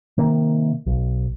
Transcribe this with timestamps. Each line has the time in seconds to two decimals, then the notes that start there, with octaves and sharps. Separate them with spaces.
0.18 C3 D#3 A#3
0.86 B1